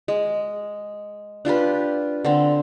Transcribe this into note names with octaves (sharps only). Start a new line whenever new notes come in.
G#3
D4 F4 G4 B4
D3 C4